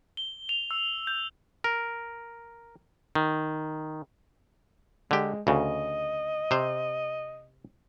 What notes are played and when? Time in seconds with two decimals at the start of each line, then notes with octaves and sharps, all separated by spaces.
0.17 G7
0.49 F7
0.71 E6
1.07 G6
1.64 A#4
3.15 D#3
5.11 D3 G#3 G4
5.47 D2 C#3 D#5
6.51 C3 C5